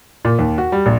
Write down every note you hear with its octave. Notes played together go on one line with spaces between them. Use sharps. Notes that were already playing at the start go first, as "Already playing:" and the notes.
A#2
D#2
F#4
G3
A#1